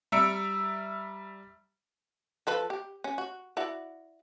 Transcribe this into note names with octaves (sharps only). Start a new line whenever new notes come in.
G3 E5 A#5 E6 C#7 D7
F3 A4 B4
G4
C#4
F#4
E4 F#4 D5